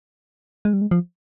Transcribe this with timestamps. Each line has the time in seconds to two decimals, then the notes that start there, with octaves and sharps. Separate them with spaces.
0.65 G#3
0.73 G3
0.81 G#3
0.91 F3